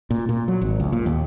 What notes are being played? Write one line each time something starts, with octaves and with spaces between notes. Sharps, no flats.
A#2
A#2
F#3
G#1
C#2
A#2
D#2